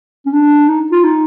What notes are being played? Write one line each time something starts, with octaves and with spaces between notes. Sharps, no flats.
C#4
D4
D#4
F4
D#4